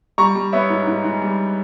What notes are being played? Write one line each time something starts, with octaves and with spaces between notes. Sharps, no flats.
G3 A#5 C#6
G3
B3 C#5 E5
G#2
G#2
G#2
G3